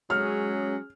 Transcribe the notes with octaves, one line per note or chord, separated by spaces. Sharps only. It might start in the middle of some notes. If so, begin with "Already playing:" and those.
F#3 G#3 C#4 G#4 F6